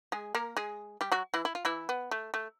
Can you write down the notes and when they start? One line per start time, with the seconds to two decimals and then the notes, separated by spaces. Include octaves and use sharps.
0.12 G#3 G#4
0.35 A#3 A#4
0.57 G#3 G#4
1.01 G3 G4
1.12 F#3 F#4
1.34 E3 E4
1.45 E4
1.55 F4
1.65 E3 E4
1.89 B3
2.11 A3
2.34 A3